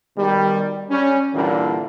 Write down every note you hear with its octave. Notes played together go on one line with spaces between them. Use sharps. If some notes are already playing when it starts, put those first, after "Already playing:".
B2 D#3 G3
G3 C#4
A#2 D3 E3 G3 A#3